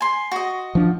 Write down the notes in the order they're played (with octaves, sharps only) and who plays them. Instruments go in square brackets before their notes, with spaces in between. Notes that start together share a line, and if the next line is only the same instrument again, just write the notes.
[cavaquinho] G#5 C6
F#4 D#5
[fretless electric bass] F3 D4